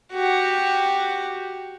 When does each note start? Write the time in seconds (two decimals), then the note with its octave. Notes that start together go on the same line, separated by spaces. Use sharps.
0.13 F#4 G4